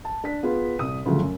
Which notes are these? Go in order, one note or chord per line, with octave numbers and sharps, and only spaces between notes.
A5
D4 B6
B3 F4 G#4
C2 D#6
D2 C#3 F3 F#3 A3
F#2